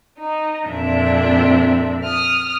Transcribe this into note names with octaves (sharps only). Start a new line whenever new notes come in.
D#4
F2 A#2 C4 D4 E5
D#6 F6